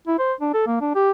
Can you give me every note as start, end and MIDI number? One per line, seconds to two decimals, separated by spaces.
0.07 0.18 64
0.19 0.33 72
0.41 0.52 62
0.54 0.63 69
0.66 0.78 58
0.81 0.94 62
0.95 1.11 67